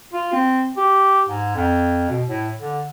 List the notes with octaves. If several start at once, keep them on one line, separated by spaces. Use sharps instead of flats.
F4
C4
G4
G#2
F2
B2
A2
D3